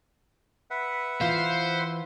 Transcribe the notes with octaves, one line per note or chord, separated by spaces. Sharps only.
B4 E5 F#5
E3 F4 C5 F5